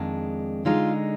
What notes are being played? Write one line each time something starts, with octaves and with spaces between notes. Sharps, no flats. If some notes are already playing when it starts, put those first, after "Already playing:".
Already playing: F2 D#3 G#3 D4
D3 G#3 D#4 F4